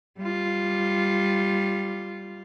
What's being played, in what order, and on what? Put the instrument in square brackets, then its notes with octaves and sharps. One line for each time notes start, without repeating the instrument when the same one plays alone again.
[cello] G3 F4